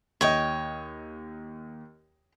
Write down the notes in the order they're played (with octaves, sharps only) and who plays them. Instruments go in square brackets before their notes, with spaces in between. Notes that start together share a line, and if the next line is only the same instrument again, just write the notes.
[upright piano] D#2 D#5 [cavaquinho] C#5 G5